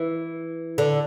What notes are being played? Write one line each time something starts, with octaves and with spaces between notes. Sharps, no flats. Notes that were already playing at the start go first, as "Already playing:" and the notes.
Already playing: E3
D3